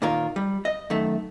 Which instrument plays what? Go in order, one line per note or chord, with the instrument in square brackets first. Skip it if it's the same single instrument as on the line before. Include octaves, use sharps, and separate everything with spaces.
[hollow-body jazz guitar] A#2 D#3 A#3 F4 A#4
G3
D#5
F#2 D#3 A3